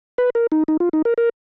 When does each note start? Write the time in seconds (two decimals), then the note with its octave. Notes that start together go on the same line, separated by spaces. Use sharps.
0.18 B4
0.35 A#4
0.52 D#4
0.68 D#4
0.80 F4
0.93 D#4
1.05 A#4
1.18 A#4